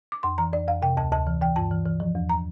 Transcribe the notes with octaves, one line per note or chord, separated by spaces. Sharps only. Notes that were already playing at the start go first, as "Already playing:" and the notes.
D6
F2 C6
E3 A#5
F2 D5
F2 F5
C3 G5
D2 A5
D2 A5
E3
E3 G5
G2 A5
E3
E3
F3
E2
A#5